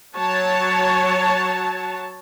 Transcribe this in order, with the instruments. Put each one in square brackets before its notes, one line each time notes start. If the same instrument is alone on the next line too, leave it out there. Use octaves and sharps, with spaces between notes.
[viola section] F#3 C#5 A5